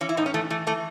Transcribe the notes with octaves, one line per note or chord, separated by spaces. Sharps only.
E3 C#4
E4
A2 D#4
C#4
E3 A3
E3 A3
E3 A3